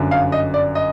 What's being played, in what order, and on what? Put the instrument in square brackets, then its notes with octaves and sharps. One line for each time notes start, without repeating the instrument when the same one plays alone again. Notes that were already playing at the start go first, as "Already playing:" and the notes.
Already playing: [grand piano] G1 F#2 D3
F5
D#5
D5
D#5